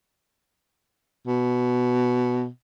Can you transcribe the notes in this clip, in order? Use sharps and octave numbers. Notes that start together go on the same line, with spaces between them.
B2